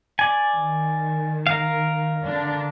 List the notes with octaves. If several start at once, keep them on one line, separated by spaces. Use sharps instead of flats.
D5 G#5
D#3
A#4 F5
D3 D4